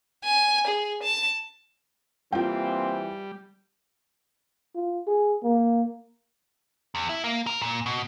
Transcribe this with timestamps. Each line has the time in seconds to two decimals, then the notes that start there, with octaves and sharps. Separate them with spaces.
0.24 G#5
0.67 G#4
1.03 A5
2.33 E3 G3 A#3 C4 F4 G5
4.75 F4
5.07 G#4
5.43 A#3
6.95 E2
7.09 E4
7.24 A#3
7.47 A#4
7.61 A#2
7.86 B2